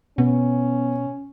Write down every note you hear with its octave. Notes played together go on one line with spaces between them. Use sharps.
B2 B3 C#4